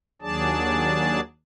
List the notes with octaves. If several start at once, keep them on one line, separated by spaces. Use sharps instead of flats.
D#2 F#3 D4 G#4 D5 A5